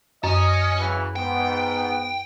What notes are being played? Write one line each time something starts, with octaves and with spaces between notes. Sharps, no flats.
F#2 C#4 D#5
C#3 E3 F#3
G#2 B3 G5